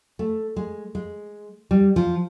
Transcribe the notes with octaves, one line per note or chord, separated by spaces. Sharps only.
A3
G#3
G#3
G3
F3